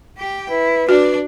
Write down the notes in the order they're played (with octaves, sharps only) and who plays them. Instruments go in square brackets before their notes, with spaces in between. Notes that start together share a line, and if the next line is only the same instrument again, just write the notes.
[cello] G4 G5
[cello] E4 [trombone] B4
[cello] D4 D5 [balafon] F#4